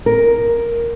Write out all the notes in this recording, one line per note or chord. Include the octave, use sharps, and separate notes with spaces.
A#4